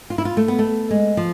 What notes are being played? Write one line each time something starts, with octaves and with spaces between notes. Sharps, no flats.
F4
E4
F4
A3
B3
A3
G#3
F3